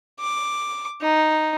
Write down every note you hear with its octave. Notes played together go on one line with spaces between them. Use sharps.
D6
D#4